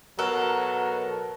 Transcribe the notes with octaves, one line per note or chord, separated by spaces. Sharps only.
B2 F#3 A4 A#4 A#5 F#6